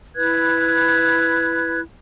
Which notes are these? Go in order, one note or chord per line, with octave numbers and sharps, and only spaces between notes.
E4 B4 F#6 G#6